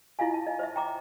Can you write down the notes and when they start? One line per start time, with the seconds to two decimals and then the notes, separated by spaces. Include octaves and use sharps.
0.19 E4 F4 D#5 F5 G#5
0.34 A5
0.47 D#5
0.59 C5 D#5 E5
0.76 G5 A#5 D6